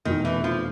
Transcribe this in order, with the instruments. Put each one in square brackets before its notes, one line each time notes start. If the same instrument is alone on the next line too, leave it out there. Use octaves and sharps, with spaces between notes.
[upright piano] F1 E2 B2 [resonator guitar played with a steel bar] D#3
[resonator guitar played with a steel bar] E3
F3